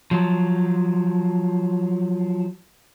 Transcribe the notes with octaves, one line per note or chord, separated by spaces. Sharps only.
F3 F#3